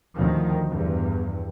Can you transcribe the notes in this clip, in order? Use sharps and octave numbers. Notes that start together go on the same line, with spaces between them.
D2 D#3 F3
E2 G2